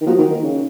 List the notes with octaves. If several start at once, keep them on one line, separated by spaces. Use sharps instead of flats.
D#3
F3 F#3 A#3 D#4 F#4
D#3
D#3
C#3